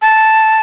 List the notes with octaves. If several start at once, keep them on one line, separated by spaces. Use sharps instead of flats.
A5